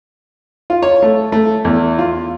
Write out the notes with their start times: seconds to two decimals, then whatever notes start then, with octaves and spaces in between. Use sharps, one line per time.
0.70 F4
0.83 C#5
1.03 A3
1.32 A3
1.65 E2
1.99 F4